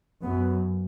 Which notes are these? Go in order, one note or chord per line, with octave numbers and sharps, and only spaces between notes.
F#2 B3